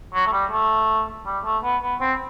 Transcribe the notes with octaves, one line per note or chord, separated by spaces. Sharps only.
F#3
A3
G3
A3
G3
A3
B3
B3
C4